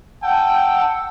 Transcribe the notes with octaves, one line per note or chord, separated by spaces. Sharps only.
F#5 G5 A5 E6